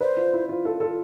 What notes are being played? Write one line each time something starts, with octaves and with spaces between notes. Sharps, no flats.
B4 C5 D5
F4
E4
F4
F4 A4
F4 A4